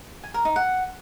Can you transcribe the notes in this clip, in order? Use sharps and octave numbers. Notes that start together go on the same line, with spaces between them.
G#5
A#4
D#4
F#5